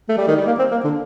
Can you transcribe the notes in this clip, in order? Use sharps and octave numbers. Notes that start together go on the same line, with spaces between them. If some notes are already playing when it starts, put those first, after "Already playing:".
A3
G3
D#3
G3
A#3
C4
A#3
D3